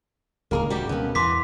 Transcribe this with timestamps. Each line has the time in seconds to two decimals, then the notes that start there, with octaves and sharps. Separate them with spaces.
0.51 D1 C#2 D#3 A#3 G#4 A#4
0.70 G3 F#4 G4
0.89 D2 B2 A#3 B3 C#4
1.15 E2 E3 C6 D6 B6